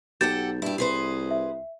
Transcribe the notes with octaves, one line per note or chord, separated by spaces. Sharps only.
B1 G4 A4 F#5 G6 A6 E7
G2 E4 G4
C2 G#4 B4 C5
E5